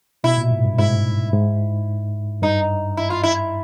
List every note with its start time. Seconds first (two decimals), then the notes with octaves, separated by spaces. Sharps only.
0.24 B2 E4
0.38 A#2
0.51 G#2
0.64 G2
0.78 G#2 E4
1.33 G#2
2.43 G2 D#4
2.97 E4
3.10 F4
3.23 E4